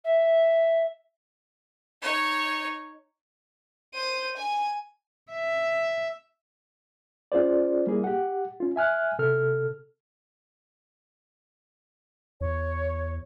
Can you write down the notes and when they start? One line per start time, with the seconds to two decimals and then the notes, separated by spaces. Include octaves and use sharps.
0.04 E5
2.02 D#4 C#5
3.94 C5 D#7
4.37 G#5
5.32 E5
7.32 C#4 F4 G#4 C5 D5
7.87 G3 A#3 E4 G#4
8.04 G4 F#5
8.60 C#4 F4
8.76 E5 G#5 F6 F#6
9.19 C3 A4 F6
12.41 E2 C#5